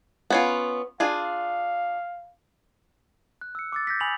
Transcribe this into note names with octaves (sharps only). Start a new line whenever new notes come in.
B3 C#4 F4
D4 F4 G#4 F5
F#6
E6 C#7
D6 E6 A6
G6 A#6 B6
G#5 B5 D#6 A#6 F7 F#7